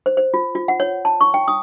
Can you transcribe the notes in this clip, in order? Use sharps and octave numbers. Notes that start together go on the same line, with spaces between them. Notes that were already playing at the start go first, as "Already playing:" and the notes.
C5
C5
F4
F4
F#5
C#5
A5
C#6
G5
D#6